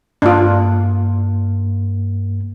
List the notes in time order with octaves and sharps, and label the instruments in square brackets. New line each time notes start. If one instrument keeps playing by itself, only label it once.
[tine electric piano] G2 A#3 [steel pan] D4 F4